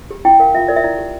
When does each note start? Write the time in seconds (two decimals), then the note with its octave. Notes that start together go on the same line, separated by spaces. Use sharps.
0.11 G4
0.25 E4 G5
0.39 A#4 F5
0.54 F4 E5
0.68 A#4 D5
0.76 E5
0.84 E4 D5
0.98 G4